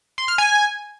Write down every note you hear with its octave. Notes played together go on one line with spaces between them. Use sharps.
C6
F6
G#5